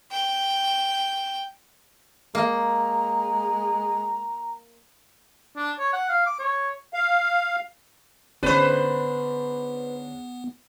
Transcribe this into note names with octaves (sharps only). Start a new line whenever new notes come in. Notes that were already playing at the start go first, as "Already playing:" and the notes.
G5
G#3 A#3 A#5
D4
C#5
F#5
F5
D6
C#5
F5
G#2 D3 B3 C#4 D4 B4 C5